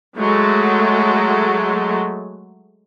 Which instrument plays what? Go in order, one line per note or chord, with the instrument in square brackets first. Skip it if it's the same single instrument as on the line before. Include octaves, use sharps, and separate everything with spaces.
[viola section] F#3 G#3 A3